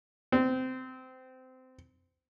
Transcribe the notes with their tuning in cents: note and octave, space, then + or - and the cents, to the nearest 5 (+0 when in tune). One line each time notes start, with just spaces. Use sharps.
C4 -20